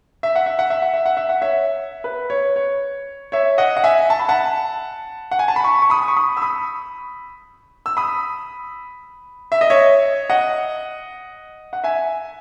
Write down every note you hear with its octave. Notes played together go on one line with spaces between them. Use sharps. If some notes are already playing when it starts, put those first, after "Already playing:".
E5
F#5
E5
F#5
E5
F#5
E5
F#5
E5
F#5
C#5 E5
B4
C#5
C#5
C#5 E5
D#5 F#5
F#5
E5 G#5
A5
B5
F#5 A5
F#5
G#5
A5
B5
A5 C#6
C#6
B5 D#6
C#6
B5 D#6
E6
B5 D#6
E6
B5 D#6
E5
D#5
C#5 E5
D#5 F#5
F#5
E5 G#5